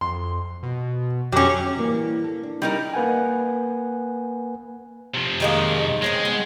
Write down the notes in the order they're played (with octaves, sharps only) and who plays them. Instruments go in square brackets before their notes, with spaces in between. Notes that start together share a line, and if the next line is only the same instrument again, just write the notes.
[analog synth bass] F2 [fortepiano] C6
[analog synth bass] B2
[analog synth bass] F2 [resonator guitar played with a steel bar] F#3 C#4 [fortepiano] G4 D6
[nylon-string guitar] E3 G3 A#3
A4
D4
[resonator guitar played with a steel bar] G3 D#4 A#4
[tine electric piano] A#3 B4 F#5 G#5
[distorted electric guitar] C3 F3
[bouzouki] D#3 G#3 A#3
[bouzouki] D#3 C4 C#4 [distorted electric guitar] G#3
[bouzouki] B3